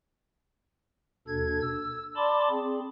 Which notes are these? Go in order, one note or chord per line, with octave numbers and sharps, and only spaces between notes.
D#2 B2 D4 A4 G#6
E6
D5 A5 B5 C6 D6
C4 G#4